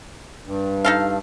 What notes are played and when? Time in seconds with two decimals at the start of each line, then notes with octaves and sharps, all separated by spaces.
0.45 G2
0.85 D#4 A4 F5